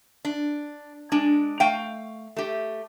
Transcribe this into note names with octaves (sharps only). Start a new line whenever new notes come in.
D4
G#3 D4
A3 F5 G5
A3 G4